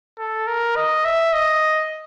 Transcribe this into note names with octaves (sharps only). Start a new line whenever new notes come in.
A4
A#4
D#5
E5
D#5